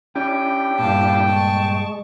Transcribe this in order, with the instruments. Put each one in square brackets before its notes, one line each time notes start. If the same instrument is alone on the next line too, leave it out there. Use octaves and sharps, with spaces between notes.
[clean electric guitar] C#4 [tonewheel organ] D4 E4 G4 [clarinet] G5
[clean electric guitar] G2 A#2 [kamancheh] F5 A5
[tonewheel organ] G#3 [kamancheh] A5 C#6